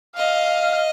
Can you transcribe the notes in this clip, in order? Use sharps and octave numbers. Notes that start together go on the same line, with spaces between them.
D#5 F5